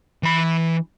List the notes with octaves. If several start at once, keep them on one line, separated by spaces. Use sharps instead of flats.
E3 B5